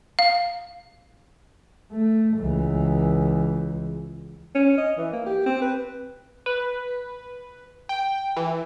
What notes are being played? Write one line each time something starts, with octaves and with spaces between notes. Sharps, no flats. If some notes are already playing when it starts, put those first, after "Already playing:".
F5
A3
C#2 E3
C#4
D#5
E3
A#3
G4
C4
B4
B4
G5
E3